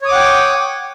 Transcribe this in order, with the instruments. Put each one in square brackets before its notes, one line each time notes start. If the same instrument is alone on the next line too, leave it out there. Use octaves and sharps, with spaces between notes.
[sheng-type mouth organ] C#5
D#6
D6
F#5
G5